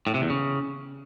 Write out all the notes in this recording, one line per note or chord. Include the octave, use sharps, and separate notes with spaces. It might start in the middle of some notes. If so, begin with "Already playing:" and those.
A2
C3
E2
C#3